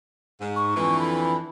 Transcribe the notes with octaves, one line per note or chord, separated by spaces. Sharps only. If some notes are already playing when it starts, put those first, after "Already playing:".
G#2
C#6
F2 D3 E3
B5